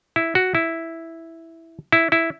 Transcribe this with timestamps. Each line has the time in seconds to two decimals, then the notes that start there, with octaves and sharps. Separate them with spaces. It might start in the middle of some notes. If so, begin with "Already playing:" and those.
0.16 E4
0.35 F#4
0.55 E4
1.92 E4
2.12 E4